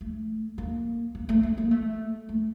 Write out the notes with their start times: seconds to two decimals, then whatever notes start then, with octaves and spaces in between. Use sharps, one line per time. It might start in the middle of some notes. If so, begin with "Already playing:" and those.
0.01 A3
0.58 A#3
1.15 A#3
1.29 A3
1.43 A3
1.58 A#3
1.71 A3
2.29 A3